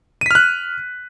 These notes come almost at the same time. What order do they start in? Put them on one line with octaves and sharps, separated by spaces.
D#7 B6 F6 F#6